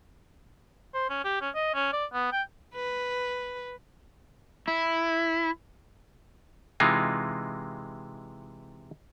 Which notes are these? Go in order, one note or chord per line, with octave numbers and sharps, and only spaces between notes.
C5
C#4
G4
C#4
D#5
C#4
D5
B3
G5
B4
E4
C3 E3 G#3 D#4 F4